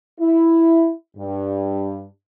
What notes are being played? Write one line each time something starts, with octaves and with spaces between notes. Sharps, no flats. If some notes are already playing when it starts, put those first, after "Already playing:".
E4
G2